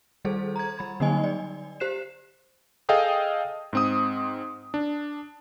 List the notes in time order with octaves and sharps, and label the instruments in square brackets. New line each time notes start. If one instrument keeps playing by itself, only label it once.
[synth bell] D#3 G3 G#4 A4 C5
A#5 G#6
G3 B5 G#6
D3 F#3 A#3 D#4 D#5 G#5
D5
G4 C5 F#6 C7 E7
[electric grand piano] G#4 A4 D#5 F5 G5 D#6
G#2 C4 D#6
D4